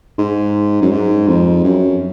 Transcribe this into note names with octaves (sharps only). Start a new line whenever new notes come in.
G#2
F#2
G#2
F2
F#2